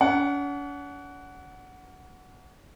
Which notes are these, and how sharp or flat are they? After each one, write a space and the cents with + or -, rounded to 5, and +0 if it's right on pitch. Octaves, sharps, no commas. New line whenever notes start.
C#4 +45 F#5 +0